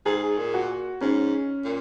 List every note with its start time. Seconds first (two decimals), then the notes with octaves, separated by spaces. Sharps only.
0.05 G#2 G#4
0.38 A#2
0.54 F#4
1.01 G#2 C#4
1.65 A#2